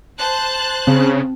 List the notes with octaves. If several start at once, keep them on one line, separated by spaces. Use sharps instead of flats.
C5 A5 F#6
C#3 C4